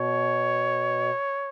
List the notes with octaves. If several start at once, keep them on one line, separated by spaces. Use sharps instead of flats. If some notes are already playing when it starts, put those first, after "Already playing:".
Already playing: B2 C#5